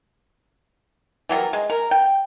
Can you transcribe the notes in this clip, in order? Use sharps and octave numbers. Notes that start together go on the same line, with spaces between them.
E3 F#3 G3 A#4
G#3
A#4
G5